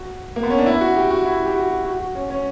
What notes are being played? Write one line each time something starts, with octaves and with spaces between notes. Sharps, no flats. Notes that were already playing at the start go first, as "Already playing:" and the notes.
Already playing: F#4
A#3
B3
C#4
D4
E4
F#4
G4
F#4
E4
G4
F#4
F#4
F#4
C#4
C#4